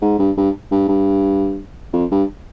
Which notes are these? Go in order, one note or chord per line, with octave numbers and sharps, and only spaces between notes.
G#2
G2
G2
G2
G2
F2
G2